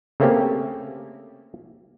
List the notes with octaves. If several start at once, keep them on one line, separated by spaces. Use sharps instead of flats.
C#3 A3 A#3 C4 C#4 G4